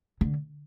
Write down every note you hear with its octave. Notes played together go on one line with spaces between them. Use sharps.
D3